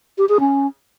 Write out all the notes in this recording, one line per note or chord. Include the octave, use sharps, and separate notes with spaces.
G4
G#4
C#4